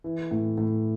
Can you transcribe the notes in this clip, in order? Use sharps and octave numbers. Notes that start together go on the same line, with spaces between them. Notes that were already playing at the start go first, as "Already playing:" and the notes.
E3
A2
A2